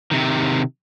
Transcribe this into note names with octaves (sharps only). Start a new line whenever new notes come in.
C3 D#3